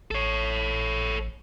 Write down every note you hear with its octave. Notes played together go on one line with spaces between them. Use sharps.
A1 A4 C#5